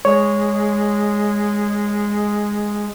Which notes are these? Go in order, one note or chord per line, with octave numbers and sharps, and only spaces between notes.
G#3 C#5